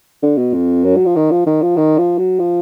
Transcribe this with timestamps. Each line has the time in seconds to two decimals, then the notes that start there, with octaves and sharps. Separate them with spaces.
0.22 D3
0.37 B2
0.54 F2
0.84 F#2
0.97 F#3
1.06 F3
1.16 D#3
1.31 F3
1.46 D#3
1.62 F3
1.77 D#3
1.98 F3
2.18 F#3
2.39 F3